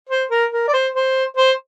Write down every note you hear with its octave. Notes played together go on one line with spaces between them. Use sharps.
C5
A#4
A#4
D5
C5
C5
C5